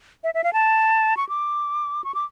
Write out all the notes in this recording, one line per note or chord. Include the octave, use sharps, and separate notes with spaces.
E5
E5
F5
A5
C#6
D6
C#6
D6